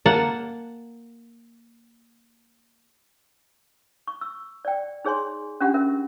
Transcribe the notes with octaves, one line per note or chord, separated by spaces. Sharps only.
A#3 F#5 A5
C#6
E6
D5 G5
D#4 G#4 C#5 G#5 C6
C#4 D4 F4 G4 F#5
C#4 A#4 E5